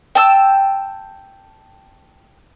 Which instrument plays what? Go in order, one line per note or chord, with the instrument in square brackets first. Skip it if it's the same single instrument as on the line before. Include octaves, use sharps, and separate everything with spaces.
[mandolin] G5 A5 E6